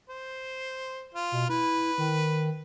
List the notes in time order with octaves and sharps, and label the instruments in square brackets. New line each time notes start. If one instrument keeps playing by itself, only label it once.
[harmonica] C5
F4
[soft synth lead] B2
[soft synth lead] E4 [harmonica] B4
[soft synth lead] D#3